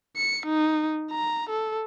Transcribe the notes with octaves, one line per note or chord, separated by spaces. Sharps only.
C#7
D#4
A#5
A4